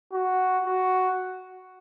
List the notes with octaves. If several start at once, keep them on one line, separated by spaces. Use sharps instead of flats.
F#4
F#4